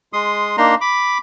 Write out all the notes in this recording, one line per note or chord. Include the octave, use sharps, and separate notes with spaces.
G#3 C6 D#6
A#3 D4 D#4 A#5 C6
B5 D6